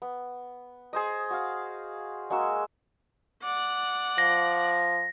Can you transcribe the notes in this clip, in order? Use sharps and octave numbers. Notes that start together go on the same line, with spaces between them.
B3
G#4 C5 D#5
F#4 F5
G#3 A#3 F#4 E6
D5 F#5
F3 A#6